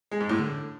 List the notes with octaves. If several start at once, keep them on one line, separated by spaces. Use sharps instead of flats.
G#3
G#2
A2
D3